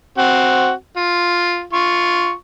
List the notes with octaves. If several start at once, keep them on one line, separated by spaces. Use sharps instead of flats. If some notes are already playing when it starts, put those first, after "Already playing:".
C4 F#4
F4
F4 C#6